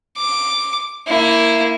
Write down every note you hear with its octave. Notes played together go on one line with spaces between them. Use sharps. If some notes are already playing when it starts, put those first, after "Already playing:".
D6
A#3 E4